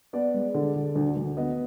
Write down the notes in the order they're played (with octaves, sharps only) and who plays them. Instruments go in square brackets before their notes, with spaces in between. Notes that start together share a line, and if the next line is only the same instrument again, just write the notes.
[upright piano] B3 D5
G#3
D3
D3
D2
D2
B3 D#5